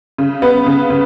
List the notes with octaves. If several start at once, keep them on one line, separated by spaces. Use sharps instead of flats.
C#3
B3
C#3
C#3